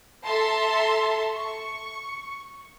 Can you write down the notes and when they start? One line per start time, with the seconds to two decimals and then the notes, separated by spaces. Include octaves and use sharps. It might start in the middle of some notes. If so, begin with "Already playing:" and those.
0.25 A4 E5 A5 A#5 C6
1.33 C#6